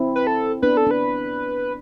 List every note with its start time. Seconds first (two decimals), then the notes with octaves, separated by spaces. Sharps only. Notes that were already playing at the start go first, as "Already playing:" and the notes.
Already playing: C4 E4
0.16 B4
0.27 A4
0.62 B3 D4 B4
0.77 A4
0.87 D4 B4